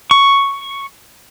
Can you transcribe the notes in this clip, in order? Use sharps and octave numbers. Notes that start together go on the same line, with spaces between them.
C#6